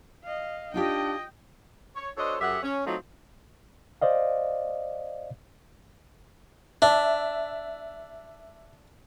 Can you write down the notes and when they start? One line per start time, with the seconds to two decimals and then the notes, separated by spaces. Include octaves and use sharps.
0.23 D#5 F5
0.74 D4 D#4 F4 G4 D#5 G5
1.96 C#5
2.17 D4 F#4 A4 C5 C#5 D#5
2.40 F#2 G4 G#4 E5 F#5
2.63 C#4
2.86 F#3 A3 C4 D#4 F4
4.01 C5 D5 D#5 F5
6.82 D4 E5